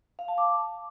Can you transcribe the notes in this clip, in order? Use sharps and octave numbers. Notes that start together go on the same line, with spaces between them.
F5
A5
D6